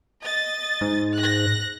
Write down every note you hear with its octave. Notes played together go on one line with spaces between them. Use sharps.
D#5 A6
G#2
F#6 A#6